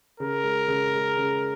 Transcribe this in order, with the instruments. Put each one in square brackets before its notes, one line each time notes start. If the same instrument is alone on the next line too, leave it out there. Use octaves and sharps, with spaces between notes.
[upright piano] C#3 [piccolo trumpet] A#4
[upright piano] G#3
C#3
G#3
C#3